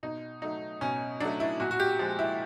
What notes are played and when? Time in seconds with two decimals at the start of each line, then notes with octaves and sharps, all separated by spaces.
0.03 B2 D#4
0.42 F#3 A3 D#4
0.81 B2 C#4
1.20 F#3 A3 D4
1.40 E4
1.60 A#2 F#4
1.71 F#4
1.80 G4
1.99 F3 G#3
2.19 E4